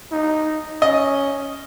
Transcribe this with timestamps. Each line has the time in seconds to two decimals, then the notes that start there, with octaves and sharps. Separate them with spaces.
0.11 D#4
0.81 C#4 D#5